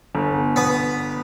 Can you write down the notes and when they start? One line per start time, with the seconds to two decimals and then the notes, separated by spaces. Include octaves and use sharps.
0.15 G1
0.56 B3